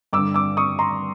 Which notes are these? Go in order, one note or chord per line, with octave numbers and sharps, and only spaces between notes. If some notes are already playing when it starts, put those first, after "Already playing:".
G2 D3 D6 E6
D6 E6
C#6 D#6
A#5 C6